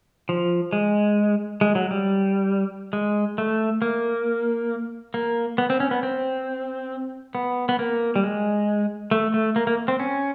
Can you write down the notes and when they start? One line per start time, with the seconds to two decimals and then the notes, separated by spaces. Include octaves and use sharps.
0.29 F3
0.73 G#3
1.61 G#3
1.75 F#3
1.91 G3
2.93 G#3
3.38 A3
3.82 A#3
5.14 A#3
5.58 B3
5.70 C4
5.80 C#4
5.91 B3
6.03 C4
7.35 B3
7.69 B3
7.79 A#3
8.16 G3
8.23 G#3
9.11 A3
9.34 A3
9.56 A#3
9.67 A#3
9.88 C4
10.00 C#4